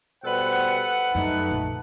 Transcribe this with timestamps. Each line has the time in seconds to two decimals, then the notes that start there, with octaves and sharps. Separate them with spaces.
0.24 B2 G3 A4 B4 C5 F#5
1.15 F#2 G3 A3 D#4
1.51 A#1